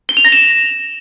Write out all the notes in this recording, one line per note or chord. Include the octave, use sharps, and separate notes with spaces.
G7
F7
A#6
E7